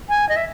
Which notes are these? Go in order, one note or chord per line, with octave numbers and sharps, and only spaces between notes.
G#5
D#5
E5